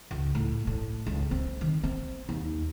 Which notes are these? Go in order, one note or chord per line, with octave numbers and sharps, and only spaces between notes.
C#2
A2
A2
C#2
C4
D#3
C4
D#2